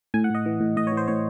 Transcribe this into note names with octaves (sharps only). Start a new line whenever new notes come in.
A2 G#5
F#5
A2
D#5
E3
A2
A2 D#5
C#5
E3
C5
A2 C#5